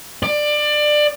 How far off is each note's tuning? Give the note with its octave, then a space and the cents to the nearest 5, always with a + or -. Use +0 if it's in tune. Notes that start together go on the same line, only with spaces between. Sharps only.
D5 +20